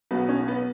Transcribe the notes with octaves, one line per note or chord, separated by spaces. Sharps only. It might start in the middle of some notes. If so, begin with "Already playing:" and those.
B1 B2 F#3 B3
C#4
B3